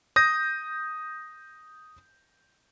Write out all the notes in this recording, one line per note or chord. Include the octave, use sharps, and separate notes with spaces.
D#6 G6 A#6